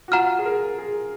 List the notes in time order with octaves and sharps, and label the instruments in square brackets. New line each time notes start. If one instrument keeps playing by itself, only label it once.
[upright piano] F#4
[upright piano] F4 [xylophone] F#5 A#5 F6
[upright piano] G#4
A#4
G#4